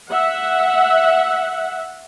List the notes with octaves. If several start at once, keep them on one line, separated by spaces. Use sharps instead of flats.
E5 F#5